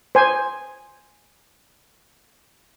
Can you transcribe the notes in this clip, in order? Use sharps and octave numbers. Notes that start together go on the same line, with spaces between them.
C5 G#5